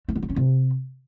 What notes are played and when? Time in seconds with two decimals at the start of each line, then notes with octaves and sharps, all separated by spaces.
0.09 A3
0.15 B3
0.22 D#4
0.29 C#4
0.36 C3